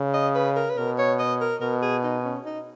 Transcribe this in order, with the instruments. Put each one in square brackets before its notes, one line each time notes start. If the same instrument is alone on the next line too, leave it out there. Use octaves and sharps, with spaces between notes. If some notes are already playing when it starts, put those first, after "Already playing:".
Already playing: [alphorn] C#3
[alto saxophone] D#5
B4
A#4
B4
[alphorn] B2 [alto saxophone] A#4
[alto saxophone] C#5
D#5
A#4
[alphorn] B2 [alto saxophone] A#4
[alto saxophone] G#4
D#4
C#4
D#4